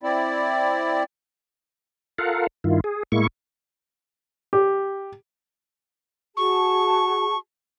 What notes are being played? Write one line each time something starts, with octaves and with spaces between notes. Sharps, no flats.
C4 E4 D5
F4 A4 A#4 F5 F#5
G2 D#3 E4 F4
G#4
A2 G#3 A#3 E4 C#6
G4
F#4 G#4 A5 C#6